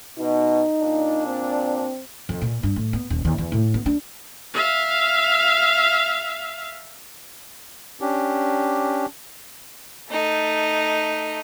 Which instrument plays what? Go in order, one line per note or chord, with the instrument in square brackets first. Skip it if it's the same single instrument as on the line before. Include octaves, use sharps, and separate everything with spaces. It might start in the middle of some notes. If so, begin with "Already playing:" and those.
[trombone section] B2 [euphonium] D#4
[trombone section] A#2 D4
[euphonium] C4
[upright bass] F2
A#2
G2
A2
B3
D#1
D#2
E2
A2
B3
D4
[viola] E5 F5
[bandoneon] C#4 D4 G4
[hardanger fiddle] A3 D#4